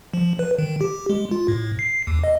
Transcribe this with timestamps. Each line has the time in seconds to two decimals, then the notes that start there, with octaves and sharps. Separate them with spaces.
0.14 F3
0.39 B4
0.58 D#3
0.81 G4
1.10 G#3
1.31 F4
1.48 A2
1.79 C7
2.07 D#2
2.24 D#5